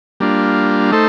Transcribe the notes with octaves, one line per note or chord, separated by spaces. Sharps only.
G3 A#3 D4 F4
A3 D#4 A4 C5